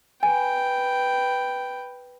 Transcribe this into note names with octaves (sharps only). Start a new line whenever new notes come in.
B4 G5 G#5